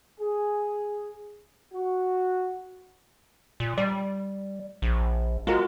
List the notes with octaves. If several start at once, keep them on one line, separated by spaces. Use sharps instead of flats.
G#4
F#4
A#2
G3 D5
A#1
G#3 F4 F#4 A#4